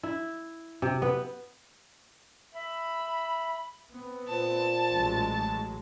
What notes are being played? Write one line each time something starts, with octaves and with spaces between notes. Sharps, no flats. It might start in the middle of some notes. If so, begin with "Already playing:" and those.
E4
C3
B3
E5 B5
B3 C4
A#2 C5 A5
A1 F#3 G#3